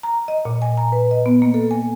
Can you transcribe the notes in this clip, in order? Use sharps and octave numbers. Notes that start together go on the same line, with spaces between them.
A#5
D#5
A#2
G#5
A#5
B4
D#5
B3
A#3
A4
G#5